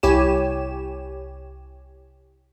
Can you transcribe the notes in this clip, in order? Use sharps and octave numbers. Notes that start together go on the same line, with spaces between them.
C2 E4 G4 C#5 G#5 E7